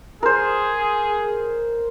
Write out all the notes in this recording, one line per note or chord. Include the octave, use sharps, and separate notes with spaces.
G#4 A#4 C5